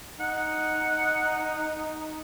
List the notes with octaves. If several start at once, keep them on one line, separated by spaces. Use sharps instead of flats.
D#4 F#5